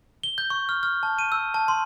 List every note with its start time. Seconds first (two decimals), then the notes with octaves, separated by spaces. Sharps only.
0.23 G7
0.38 G6
0.50 C#6
0.69 F6
0.83 F6
1.03 A5
1.19 D#7
1.32 E6
1.54 A5
1.68 C6